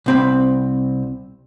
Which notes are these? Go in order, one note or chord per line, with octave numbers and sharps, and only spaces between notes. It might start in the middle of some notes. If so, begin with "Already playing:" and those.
C2 C4 B5